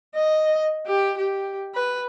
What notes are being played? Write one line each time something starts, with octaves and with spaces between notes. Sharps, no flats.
D#5
G4
G4
B4